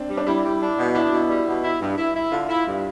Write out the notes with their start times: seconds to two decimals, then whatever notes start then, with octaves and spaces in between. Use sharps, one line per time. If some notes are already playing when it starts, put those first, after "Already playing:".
Already playing: C4 D4
0.09 G3
0.17 D4
0.26 G3 E4
0.44 G3
0.61 D4
0.77 B2
0.94 D4 E4
1.12 B2
1.29 G3
1.47 B2
1.63 E4
1.80 G2
1.97 E4
2.15 E4
2.31 D3 F4
2.48 E4
2.66 G2